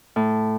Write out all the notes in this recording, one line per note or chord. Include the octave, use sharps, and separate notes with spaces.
A2